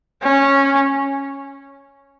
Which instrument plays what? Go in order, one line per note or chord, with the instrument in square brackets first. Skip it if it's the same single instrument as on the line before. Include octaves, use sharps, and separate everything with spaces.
[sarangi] C#4